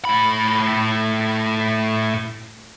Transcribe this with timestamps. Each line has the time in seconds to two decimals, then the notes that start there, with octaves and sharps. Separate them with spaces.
0.05 A2 B5